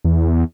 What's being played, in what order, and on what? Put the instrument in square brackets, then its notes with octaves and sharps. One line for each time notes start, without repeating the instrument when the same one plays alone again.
[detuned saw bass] E2